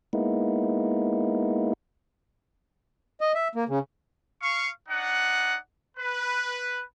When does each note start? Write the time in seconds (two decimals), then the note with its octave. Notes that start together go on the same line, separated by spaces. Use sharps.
0.13 G#3 A#3 B3 D#4 E4
3.21 D#5
3.35 E5
3.55 A#3
3.69 C#3
4.42 F5 C#6
4.89 D4 D#4 F#5
5.98 B4